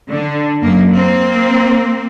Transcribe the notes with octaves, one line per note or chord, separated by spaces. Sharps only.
D3
F#2 A#3
A#3 C4